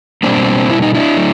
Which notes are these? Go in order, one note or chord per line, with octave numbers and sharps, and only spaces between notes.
B2 G3 A#3 C4 D4
E4
D#4
D4 E4
F#3 A3